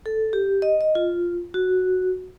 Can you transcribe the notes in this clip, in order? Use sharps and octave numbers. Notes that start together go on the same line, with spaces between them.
A4
G4
D#5
D#5
F4
F#4